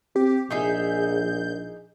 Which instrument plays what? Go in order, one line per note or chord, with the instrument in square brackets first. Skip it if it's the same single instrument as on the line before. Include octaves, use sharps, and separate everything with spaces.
[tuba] C4 [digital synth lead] G4
[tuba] A#1 [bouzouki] D#4 G#4 E5 [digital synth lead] G6